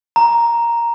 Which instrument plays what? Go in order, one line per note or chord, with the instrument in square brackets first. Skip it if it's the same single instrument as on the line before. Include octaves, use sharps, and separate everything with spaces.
[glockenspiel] A#5